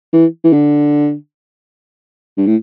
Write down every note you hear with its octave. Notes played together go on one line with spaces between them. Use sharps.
E3
E3
D3
G2
A2